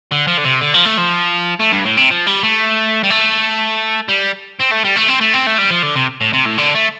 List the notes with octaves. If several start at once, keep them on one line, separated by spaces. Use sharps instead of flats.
D3
F3
D3
C3
D3
F3
A3
F3
A3
G2
A2
C3
F3
G3
A3
G3
A3
G3
C4
A3
G3
A3
C4
A3
C4
A3
G3
F3
D3
C3
A2
C3
A2
D3
A3